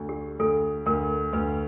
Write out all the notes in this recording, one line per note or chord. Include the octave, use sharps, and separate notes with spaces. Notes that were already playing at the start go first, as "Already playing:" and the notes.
Already playing: D2
G4
D2 A4
D2 A#4
D2 B4